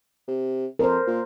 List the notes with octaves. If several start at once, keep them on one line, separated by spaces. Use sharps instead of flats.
C3
F2 A#4 C5
A#2